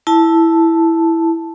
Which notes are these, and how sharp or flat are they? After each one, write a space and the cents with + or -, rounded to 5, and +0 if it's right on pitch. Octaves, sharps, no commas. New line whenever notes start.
E4 +0 A5 +0